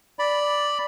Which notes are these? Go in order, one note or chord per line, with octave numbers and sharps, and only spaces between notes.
D5 B5